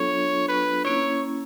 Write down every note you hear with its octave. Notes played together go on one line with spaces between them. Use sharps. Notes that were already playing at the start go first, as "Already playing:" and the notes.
Already playing: F#3 B3 D4 F4 A4 C#5
B4
A#3 C#4 E4 C#5